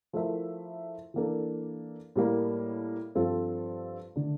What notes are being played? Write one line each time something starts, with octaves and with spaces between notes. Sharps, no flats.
F3 A3 E4 A#4 E5
E3 A#3 D4 A4
A2 G3 A#3
G2 F3 C4 F4 A4
D3 A3 D4